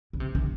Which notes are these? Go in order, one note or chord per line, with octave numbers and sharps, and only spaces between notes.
D3
C3
D3